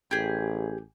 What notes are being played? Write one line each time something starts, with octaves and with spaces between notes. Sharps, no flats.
A1 G4 G#4